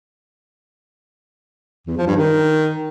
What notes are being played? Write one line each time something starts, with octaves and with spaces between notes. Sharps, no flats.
E2
F3
G2
D#3